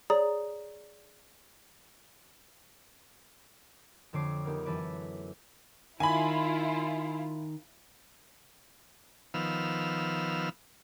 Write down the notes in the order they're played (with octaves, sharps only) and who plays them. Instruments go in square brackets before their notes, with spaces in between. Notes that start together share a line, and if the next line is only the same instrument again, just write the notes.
[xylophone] G#4 C#5 D5 A#5 D#6
[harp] F2 D3 A3 C#5 D6 C7
A#3 B3 D#4 G4
F#2 E3 A4 B4 C#5 D6
[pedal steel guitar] D#3 [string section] E4 F4 [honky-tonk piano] G#5 B5
[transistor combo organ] D#3 F3 B3 E6 F6